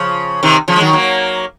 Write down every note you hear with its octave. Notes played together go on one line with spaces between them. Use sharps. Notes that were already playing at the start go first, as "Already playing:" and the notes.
Already playing: C#3 F3
C3 D#3
C#3 F3
G#3
D#3 F#3
F#3 A#3